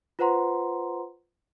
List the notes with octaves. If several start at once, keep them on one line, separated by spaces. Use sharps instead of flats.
F4 B4 C5 F#5 A#5 C6